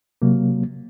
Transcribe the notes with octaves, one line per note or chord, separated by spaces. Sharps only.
C3 F#3 A#3